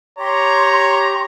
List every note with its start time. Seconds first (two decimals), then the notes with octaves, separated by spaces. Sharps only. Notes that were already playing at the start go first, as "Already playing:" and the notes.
0.19 G4 C#5 A#5 C6